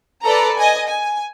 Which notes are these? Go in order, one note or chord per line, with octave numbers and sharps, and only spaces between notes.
A4 B4 D5 A#5
D#5 G#5
G#5